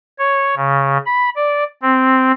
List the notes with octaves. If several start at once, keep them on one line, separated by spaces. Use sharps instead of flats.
C#5
C#3
B5
D5
C4